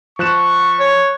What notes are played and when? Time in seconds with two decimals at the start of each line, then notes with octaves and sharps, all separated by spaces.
0.19 F3 C#6 F#6 E7
0.80 C#5